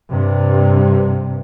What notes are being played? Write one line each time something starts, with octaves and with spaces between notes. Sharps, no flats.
G2 C3